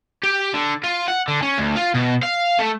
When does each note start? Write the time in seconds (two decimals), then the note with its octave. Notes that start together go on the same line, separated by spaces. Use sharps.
0.23 G4
0.54 D3
0.84 F4
1.08 F#5
1.28 D3
1.42 C#4
1.58 D2
1.76 F4
1.94 B2
2.23 F5
2.59 A3